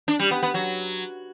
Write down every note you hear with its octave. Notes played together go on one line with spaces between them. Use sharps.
D4
G3
B3
B3
F#3